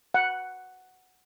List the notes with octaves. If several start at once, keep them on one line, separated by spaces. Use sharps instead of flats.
F#5